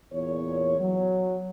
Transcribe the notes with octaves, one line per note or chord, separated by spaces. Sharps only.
E2 A#2 C#5
F#3